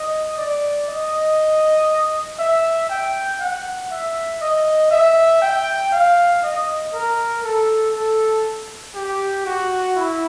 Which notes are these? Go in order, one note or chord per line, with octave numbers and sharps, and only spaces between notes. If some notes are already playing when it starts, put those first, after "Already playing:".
Already playing: D#5
D5
D#5
E5
G5
F#5
E5
D#5
E5
G5
F5
D#5
A#4
A4
A4
G4
F#4
E4